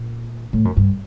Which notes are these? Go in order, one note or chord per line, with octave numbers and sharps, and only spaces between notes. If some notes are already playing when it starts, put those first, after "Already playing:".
Already playing: A#2
A2
F#2
G2